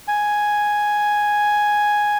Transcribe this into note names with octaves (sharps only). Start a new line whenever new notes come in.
G#5